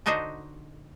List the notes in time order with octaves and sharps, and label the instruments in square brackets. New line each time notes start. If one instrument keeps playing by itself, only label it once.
[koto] D3 D4 D#4 F#4 C5 D#5